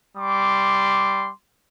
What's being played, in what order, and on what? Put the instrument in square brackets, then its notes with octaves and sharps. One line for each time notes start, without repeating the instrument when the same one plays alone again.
[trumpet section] G3 C6 D6